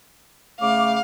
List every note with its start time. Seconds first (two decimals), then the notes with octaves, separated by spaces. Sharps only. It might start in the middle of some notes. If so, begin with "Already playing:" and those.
0.61 C#3 A3 F5 D6